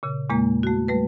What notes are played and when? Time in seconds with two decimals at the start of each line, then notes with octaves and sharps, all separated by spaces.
0.03 A#2 C#3
0.30 E2 A#2 G#3 A#3 A#5
0.63 A3 F#4
0.88 G3 A3 B4